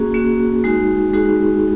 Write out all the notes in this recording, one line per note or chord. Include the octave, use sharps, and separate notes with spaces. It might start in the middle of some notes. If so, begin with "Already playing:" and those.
Already playing: A#3 C#4 F#4 G#4
A#3 C#4 F#4
G#3 D#4 F#4
G#3 D#4 F#4 G#4